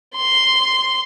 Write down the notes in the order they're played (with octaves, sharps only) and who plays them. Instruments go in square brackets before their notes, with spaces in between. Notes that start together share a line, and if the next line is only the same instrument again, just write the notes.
[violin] C6